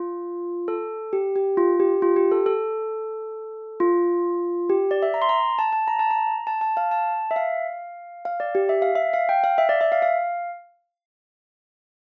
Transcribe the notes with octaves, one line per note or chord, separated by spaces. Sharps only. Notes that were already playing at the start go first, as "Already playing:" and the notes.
Already playing: F4
A4
G4
G4
F4
G4
F4
G4
A4
A4
F4
G4
D5
E5
A#5
C6
A#5
A5
A5
A#5
A5
A#5
A5
A5
F5
A5
E5
F5
F5
D5
G4
E5
F5
E5
F5
G5
F5
E5
D5
E5
F5
F5